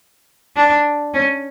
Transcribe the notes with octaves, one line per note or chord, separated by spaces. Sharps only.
D4
C#4